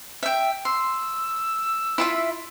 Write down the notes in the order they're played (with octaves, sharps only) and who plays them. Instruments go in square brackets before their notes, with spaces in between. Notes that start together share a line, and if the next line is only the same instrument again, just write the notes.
[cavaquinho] E5 G5
[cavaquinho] C6 [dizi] E6
[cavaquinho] E4 F4 E5